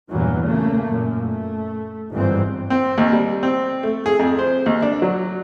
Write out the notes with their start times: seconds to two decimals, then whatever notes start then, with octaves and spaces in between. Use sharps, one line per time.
0.11 E2 G2 A#2 E3 F#3
0.46 C#3 A3 A#3
0.87 F#2 A#2
1.21 A3
2.13 G1 G#2 E3 C4
2.70 C4
2.98 D#2
3.13 G3
3.43 C4
3.83 A3
4.06 G#4
4.19 F2
4.39 C5
4.66 D#2
4.82 D4
5.02 F#3